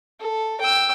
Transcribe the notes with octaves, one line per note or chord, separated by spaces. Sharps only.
A4
G5 E6